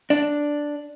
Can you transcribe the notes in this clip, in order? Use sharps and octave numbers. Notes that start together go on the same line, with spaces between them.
D4